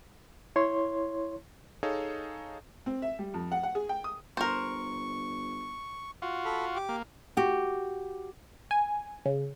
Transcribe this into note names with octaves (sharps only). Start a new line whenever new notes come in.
E4 C#5 C6
D#4 G#4 A4 C#5 D#5 F5
C4
E5
G3
F2
F#5
F#5
G#4
G5
D#6
G1 A#4 C5 C#6
F4 F#4
A4 B5 F6
G4 D6
A#3
F#4 G4
G#5
C#3